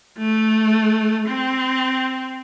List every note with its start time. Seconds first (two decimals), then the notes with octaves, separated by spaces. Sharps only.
0.18 A3
1.28 C4